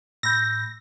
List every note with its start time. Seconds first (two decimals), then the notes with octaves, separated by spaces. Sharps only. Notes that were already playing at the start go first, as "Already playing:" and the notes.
0.23 A2 B5 E6 G6 A#6